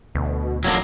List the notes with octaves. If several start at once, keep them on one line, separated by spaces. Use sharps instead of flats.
D2 B2
D#1 F#3 A#3 D4